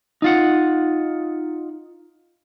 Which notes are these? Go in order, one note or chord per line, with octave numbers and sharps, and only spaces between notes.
D#4 F4 F#5